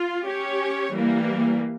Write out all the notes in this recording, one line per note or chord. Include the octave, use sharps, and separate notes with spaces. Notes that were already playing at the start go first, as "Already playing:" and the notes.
Already playing: F4
C#4 G4 C#5
E3 G3 A#3